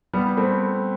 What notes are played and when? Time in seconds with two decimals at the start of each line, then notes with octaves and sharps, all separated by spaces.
0.13 G3 B3
0.37 A3 C4